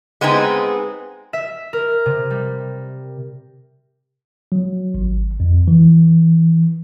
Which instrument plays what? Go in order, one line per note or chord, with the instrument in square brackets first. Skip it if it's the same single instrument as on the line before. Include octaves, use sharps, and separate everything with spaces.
[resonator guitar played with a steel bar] G#3 B3 C4 D#4 G#4
[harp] E5
A#4
C3
G3
[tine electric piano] F#3
G#1
F2
E3